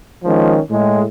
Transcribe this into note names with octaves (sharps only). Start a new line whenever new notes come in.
D#3 F3 G#3 C#4
A2 G#3